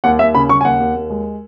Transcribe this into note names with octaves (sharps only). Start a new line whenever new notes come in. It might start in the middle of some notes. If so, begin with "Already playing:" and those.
D#2 F#5
D#2 E5
C#3 B5
C#3 C#6
G#5
D#2 F#5
D#2
D#2
G#3